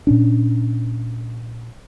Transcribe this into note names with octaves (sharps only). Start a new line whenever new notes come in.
A#2 C#4 D4